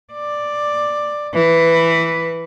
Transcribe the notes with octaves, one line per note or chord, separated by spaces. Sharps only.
D5
E3 B4